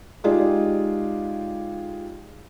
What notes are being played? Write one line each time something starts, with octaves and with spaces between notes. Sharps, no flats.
G#3 D#4 F4 G4 G#4 D5